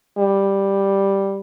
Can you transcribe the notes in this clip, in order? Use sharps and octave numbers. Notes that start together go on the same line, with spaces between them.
G3